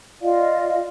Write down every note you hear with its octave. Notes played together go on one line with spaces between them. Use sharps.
F4 D5 D#5 F5